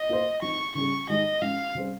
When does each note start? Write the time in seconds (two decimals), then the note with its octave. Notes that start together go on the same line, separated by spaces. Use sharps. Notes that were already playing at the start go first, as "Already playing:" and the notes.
Already playing: D#5
0.09 A#3 F4 C5
0.42 F3 C4 D#4 C#6
0.75 C#3 G3 C#4 G#4 C#6
1.09 D#3 G#3 D#4 G4 D#5
1.42 F3 G#3 C#4 F5
1.75 C3 G3 C#4 G#4 C5